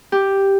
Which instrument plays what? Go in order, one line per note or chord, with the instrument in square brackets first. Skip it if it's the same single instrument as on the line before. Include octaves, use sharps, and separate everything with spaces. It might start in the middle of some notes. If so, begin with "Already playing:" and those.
[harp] G4